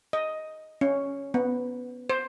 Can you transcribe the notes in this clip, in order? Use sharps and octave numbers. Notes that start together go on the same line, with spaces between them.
D#5
C#4
B3
C5